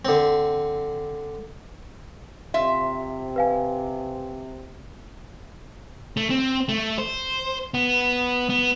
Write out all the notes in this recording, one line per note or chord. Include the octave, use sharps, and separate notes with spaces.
D3 C4
C3 F4 E5
B4 F5 G#5
A3
C4
A3
C5
B3
B3